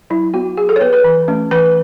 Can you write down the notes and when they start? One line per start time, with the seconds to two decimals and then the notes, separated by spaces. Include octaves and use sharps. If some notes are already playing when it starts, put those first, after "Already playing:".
0.10 F#3 E4
0.34 B3 F#4
0.57 F#3 G#4
0.69 A4
0.76 C#5
0.81 B3 B4
0.93 B4
1.04 E3
1.28 A3 C#4
1.51 E3 B4